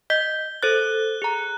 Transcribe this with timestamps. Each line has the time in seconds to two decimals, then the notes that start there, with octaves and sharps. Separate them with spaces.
0.10 D#5 G6 B6 G7
0.63 A4 C5 F#6 A6
1.22 G#4 A#5